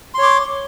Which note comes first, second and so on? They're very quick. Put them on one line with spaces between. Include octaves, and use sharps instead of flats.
C6 C#5 D6